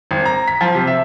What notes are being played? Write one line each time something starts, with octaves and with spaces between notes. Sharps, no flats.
G#1
A#5
B6
F3
C3
E5